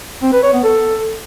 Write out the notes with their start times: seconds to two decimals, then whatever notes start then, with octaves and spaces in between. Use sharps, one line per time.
0.22 C4
0.33 B4
0.43 C#5
0.53 B3
0.64 A4